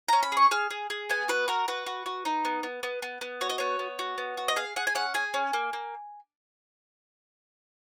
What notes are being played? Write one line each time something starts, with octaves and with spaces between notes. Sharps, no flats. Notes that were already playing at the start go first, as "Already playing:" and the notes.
C#4 A#5
B5
G#4 C#6
G#4 F6
G#4
G#4
B3 G#5
F#4 B4
F#4 A#4
F#4 B4
F#4
F#4
D#4
B3
B3
B3
B3
B3
F#4 C#5
D#5
B3 C#5
B3
F#4
B3
F#4
D#5
G#4 F5
G#4 F#5
G#5
C#4 F#5
G#4 G#5
C#4
A#3
A#3